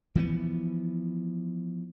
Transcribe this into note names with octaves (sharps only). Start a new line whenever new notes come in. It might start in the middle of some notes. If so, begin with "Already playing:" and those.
E3 F3 A#3 B3